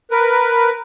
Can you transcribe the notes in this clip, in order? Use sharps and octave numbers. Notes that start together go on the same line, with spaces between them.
A#4 B4